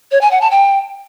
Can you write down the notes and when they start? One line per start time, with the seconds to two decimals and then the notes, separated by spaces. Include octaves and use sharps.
0.12 C#5
0.21 G#5
0.31 F#5
0.41 A5
0.51 G5